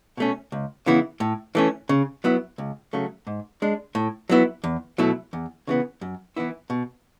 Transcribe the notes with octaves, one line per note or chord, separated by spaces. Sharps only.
B2 A3 C#4
C#2
C#3 E3 B3 E4
A2
E3 A3 C#4
C#3
F#3 B3 E4
C#2
C#3 F#3 A3
G#2
G#3 D4
A2
F#3 B3 E4
E2
B2 F#3 A3 E4
E2
C#3 E3 B3
F#2
E3 B3 E4
B2